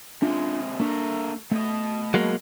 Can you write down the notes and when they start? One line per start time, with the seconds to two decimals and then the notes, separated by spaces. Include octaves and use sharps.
0.22 C3 G#3 C#4 D4 F4
0.80 A3 A#3 D4 A#4
1.52 B2 A3 D#5
2.14 F#3 G#3 A#3